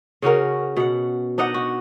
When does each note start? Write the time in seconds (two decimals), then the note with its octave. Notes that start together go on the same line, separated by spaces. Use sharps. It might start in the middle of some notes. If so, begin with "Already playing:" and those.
0.22 C#3 C#4 F#4 A#4
0.77 B2 F#5
1.38 D4 D#4 D#5 F#5
1.54 F#4